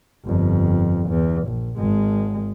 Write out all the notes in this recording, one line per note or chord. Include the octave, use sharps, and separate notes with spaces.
G1 F2
E2
A#1
G#1 G#3